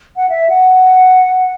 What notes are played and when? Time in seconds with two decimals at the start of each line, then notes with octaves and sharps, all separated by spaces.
0.16 F#5
0.29 E5
0.49 F#5